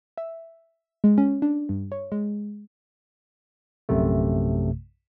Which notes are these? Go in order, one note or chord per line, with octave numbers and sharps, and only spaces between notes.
E5
G#3
C#4
D4
G2
C#5
G#3
A#1 F#2 C3 A3